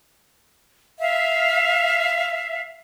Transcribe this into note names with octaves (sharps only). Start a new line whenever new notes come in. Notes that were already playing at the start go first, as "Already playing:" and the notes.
E5 F5